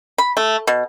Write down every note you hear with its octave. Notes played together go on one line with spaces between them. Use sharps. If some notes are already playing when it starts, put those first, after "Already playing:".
B5
A3
B2